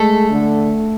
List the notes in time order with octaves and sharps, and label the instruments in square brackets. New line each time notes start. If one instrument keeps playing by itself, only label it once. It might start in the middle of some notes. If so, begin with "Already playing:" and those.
Already playing: [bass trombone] G#3 [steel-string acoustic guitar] A3 A4
[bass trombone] D3